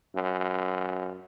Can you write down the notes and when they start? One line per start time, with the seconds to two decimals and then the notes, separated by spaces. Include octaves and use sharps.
0.15 F#2